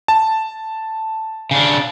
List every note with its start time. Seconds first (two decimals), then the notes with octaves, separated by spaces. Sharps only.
0.08 A5
1.51 C#3 D4